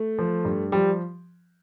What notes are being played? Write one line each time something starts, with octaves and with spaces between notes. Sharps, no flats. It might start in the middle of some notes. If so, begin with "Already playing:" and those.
Already playing: A3
F3
G2
F3 G3